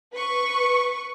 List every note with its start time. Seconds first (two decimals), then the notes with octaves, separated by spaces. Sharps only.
0.14 B4 C#6